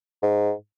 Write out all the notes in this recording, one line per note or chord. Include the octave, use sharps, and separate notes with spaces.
G#2